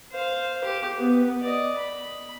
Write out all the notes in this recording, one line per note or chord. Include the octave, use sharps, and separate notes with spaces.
C5 F5
G4
B3
D5 D#5
B5